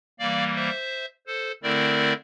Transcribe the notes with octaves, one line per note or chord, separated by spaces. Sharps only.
E3 G3 A#3 D5 F5
C5 E5
A4 C5
D3 A3 C4 E4 A#4 D5